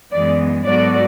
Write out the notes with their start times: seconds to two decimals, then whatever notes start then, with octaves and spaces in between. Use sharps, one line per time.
0.11 F#2 E3 G#3 B3 D5
0.65 G#2 F#3 B3 F#4 A4 D5